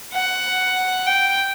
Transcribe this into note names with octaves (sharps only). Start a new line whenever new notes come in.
F#5
G5